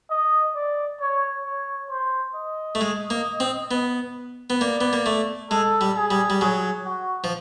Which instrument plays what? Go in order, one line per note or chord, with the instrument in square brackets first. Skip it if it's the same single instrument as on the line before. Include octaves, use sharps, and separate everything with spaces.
[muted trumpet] D#5
D5
C#5
C#5
C5
D#5
[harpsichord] A3
G#3
A#3
C4
B3
B3
[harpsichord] A#3 [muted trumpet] D5
[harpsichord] B3
A#3
A3
[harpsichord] G#3 [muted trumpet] A4
[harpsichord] G3
[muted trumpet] G#4
[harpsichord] G3
G3
[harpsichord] F#3 [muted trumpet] G#4
[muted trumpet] F#4
[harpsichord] F3